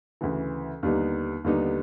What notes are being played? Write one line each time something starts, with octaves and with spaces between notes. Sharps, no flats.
D2 C#3 E3
D#2 D3 G3 B3 D#4
D#2 D3 G3 B3 D#4